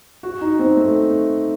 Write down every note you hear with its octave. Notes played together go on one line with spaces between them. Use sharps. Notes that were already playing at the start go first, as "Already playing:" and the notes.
F#4
D#4
C4
A3